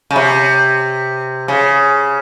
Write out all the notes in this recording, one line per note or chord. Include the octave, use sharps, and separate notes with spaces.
C#3
C3
C#3